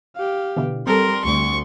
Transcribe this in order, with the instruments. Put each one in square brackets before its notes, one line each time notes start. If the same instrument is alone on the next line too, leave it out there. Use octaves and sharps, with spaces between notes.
[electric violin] G4 F5
[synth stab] B2 D3 E3
[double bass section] G3 [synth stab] C4 A4 [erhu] A#4 [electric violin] C6
[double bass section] D2 [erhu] C#6